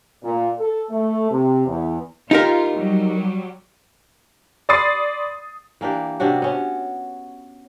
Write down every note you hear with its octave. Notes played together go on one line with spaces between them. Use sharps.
A#2
A4
A3
C3
E2
D#4 F4 G4 A#4
F#3 G3
D5 B5 C6 D#6 A6 C7
E3 A#3 D4 G4
C3 C#4 D4 F#4
B3 C#4